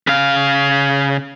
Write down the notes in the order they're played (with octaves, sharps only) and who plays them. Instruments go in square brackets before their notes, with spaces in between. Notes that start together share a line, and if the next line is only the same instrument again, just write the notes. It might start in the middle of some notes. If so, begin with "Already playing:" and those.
[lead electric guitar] C#3 F5